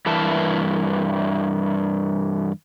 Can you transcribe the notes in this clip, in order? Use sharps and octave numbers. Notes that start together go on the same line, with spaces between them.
G2 E3 E4 A#4 B4 A5